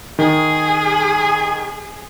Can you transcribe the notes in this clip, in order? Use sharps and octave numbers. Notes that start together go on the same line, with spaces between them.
D#3 G#4